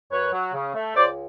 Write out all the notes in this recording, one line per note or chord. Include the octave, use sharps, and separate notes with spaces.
F#2 B4 C#5
F#3
C#3
A3
C#2 C5 D5